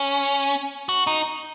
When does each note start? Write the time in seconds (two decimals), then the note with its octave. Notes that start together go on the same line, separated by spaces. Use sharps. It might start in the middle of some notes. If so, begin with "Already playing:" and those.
Already playing: C#4
0.89 F#4
1.07 D#4